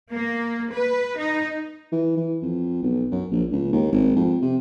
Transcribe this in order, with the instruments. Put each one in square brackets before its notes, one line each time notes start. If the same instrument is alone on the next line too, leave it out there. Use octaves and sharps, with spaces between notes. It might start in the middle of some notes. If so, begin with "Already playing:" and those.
[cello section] A#3
B4
D#4
[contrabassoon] E3
E3
F2
B1
F#2
A#1
C#2
D#2
G#1
F2
C3